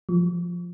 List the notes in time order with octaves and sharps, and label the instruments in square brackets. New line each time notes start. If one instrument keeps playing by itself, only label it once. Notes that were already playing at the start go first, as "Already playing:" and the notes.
[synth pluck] F3